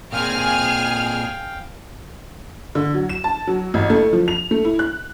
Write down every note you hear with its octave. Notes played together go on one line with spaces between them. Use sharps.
A#2 C4 G#4 F5 G5 G#5 F6
D3
F#3
E7
A5
F#3
A1
A3
F3
F7
A3
E4
F#6